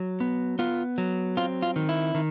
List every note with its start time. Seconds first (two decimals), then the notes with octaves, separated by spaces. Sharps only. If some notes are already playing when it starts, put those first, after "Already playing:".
Already playing: F#3
0.20 B3
0.59 B3 F4
0.98 F#3
1.37 C4 F4
1.62 F4
1.76 D#3
1.89 E4
2.15 D#3